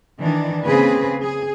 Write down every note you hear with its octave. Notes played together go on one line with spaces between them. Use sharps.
D#3 E3 D4
C#3 A#3 C4 G#4 B4
G#4